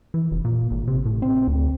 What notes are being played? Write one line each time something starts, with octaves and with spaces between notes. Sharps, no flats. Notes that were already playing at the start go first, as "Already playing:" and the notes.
E3
F1
A#2
G#1
C3
A2
C4
D2